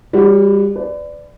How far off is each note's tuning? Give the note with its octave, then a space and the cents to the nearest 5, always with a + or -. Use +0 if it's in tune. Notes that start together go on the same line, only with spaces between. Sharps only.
G3 +30 F#4 +0 C#5 +35
B4 +35 D5 +0